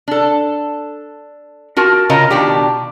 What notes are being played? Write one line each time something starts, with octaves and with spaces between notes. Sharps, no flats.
D4 A4
F4 F#4 A#4 A5
C#3 F4 A#4 C#5 D#5 A#5
B2 D#3 D4 F4 G4